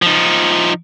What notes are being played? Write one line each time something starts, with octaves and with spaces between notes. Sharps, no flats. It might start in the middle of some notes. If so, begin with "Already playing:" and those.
F3 D#4